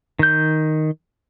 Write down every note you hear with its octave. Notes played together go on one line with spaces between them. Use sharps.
D#3 G6